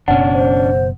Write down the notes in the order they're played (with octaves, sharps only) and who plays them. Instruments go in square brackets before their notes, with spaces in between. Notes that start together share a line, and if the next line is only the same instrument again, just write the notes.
[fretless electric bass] F#1 B2 [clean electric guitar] C#4 D4 [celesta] F#5
[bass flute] C5